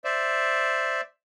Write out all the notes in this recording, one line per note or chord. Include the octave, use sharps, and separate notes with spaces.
C5 D5 E5